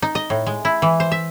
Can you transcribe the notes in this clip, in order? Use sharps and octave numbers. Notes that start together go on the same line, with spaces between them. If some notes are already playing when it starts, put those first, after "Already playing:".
D#4
D#5
A2
G#3
E4
E3
C5
E5